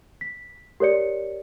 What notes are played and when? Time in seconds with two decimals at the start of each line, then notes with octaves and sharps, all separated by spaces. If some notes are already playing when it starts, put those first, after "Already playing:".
0.21 B6
0.80 G4 A#4 C#5 D5 C#7